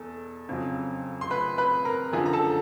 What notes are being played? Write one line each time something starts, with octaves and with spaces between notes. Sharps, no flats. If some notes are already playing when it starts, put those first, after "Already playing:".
Already playing: E2 B2 A4
F2 C#3 F#3
C6
B4 B5
B4 B5
A#4 A#5
F#2 D3 F3 G#4 G#5
A#5
A4 A5